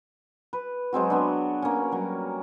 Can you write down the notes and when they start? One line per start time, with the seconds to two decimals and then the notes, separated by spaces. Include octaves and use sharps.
0.53 B4
0.93 F#3 G#3 C4 F#4
1.10 B3 D4
1.62 A#3 C#4
1.92 F#3 G3